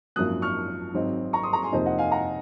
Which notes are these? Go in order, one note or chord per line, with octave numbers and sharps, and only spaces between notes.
G#1 F#2 F3 A#3 D#6 F#6
C#6 F6
G#1 G#2 F#3 C4 D#4
A#5 C#6
C6 D#6
A#5 C#6
G#5 C6
F2 C3 D#3 A#3 C5 D#5
D#5 F#5
F5 G#5
F#5 A#5